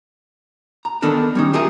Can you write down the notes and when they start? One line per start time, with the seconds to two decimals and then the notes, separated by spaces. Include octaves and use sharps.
0.85 A#5
1.02 D#3 B3 D4 A4 A#4
1.35 G3 C#4 D#4
1.53 F4 G4 G#4 A#4 E5